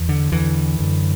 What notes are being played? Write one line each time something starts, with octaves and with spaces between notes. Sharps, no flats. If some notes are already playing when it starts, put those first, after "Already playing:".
Already playing: E2
D3
E2 D3 E3
F#2 D3